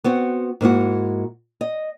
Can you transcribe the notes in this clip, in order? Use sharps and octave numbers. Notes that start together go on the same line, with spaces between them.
B3 C4 F#4
G#2 A#3 E4 F#4
D#5